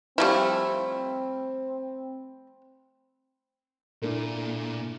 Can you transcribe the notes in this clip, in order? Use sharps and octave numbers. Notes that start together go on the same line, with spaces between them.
F3 G3 A3 C4 E4
A#2 A3 D4 E4